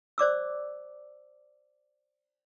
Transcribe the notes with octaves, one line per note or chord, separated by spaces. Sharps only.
C5 D5 D6 E6